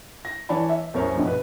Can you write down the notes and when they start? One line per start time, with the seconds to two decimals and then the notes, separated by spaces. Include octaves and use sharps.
0.25 A#6
0.49 E3 C#5 D5 A5 B5
0.69 E5
0.94 C2 F#2 C#4 A#4 C5 C#5
1.15 A#1 G2 B2
1.27 B4